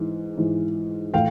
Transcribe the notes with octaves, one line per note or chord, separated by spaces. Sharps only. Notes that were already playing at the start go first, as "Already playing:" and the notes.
Already playing: G#2 E3
G#2 E3
A2 E3 F5 G5